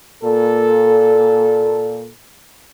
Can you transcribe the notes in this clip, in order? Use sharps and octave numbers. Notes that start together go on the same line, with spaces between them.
A#2 A4